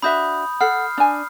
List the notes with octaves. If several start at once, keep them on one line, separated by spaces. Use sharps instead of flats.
D4 F#4 E5 B5 D#6 G6
A4 F#5 F6 C7
D4 G#5